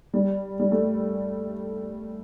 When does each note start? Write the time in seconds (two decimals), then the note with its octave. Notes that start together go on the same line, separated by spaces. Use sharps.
0.14 G3
0.59 G3
0.71 A3